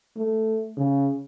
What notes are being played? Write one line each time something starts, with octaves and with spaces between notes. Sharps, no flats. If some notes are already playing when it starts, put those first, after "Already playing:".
A3
C#3